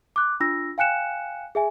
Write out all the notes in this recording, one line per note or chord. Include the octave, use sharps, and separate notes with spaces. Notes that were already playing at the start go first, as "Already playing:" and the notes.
D6 F#6
D4 F4 E6 A#6
F5 G5 G#5 F#6 C#7 E7
G#4 E5 G#5